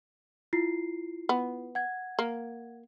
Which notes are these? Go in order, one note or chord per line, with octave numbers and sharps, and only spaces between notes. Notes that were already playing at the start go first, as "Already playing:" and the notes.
E4 F4 C7
B3
F#5 G#6
A#3